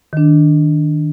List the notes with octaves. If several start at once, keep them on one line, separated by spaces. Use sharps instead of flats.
D#3 D4